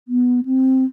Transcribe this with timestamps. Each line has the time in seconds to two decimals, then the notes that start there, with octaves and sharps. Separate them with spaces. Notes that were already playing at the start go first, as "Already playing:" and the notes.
0.08 B3
0.45 C4